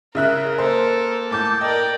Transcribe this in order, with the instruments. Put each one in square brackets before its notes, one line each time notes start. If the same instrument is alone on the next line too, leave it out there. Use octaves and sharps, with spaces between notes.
[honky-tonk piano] C#3 E5 F#6 [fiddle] A#4
[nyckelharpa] A#3 A4 [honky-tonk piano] C5
[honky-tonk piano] A2 D6 G6 [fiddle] A5
[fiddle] A#4 D5 [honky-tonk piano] D#5 [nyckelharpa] G5